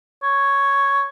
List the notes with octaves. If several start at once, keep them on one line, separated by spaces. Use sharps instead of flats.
C#5